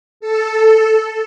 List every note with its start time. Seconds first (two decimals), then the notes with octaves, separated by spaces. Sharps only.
0.20 A4